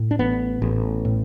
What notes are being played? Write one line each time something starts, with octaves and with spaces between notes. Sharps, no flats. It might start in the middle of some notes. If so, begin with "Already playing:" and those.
Already playing: A2
D4
A1 B3
A1
A2